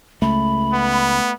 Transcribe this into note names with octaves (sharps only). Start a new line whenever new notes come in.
C#2 A3 B5
B3